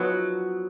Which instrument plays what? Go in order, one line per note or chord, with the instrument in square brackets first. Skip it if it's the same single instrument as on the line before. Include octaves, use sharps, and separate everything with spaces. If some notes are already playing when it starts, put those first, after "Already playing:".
Already playing: [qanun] F3 B3 D#4 F#4 [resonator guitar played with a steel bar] F#3